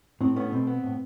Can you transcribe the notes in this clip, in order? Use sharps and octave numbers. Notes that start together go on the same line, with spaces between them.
A2 C4
A3 B3 C#4
B2 C4
B3
A2